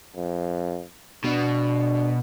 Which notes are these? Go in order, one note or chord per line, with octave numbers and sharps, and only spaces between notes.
F2
B2 D4